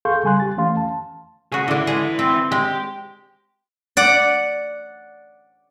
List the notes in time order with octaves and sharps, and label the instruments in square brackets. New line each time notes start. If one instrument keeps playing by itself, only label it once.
[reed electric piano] G#4 A4 F5 C6 C#6 G6
C#3 G3 G#5 C6 F#6
G4 A6
E3 A3 C#4 F5 C6
A5
[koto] C#3 F#4 [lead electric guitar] G#4
[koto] D3 D4 [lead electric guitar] E3 E4
[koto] G#3 G#4
C4
[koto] G#3 [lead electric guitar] G4
[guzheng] D5 F#5